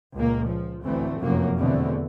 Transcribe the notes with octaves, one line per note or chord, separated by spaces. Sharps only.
C#2 A#2 A#3
F3
A1 D2 E3 A3 C4
F1 F#2 F#3 A#3
E2 B2 D3 A3 C4